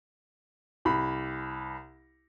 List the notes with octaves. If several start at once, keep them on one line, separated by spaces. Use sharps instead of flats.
C2 B5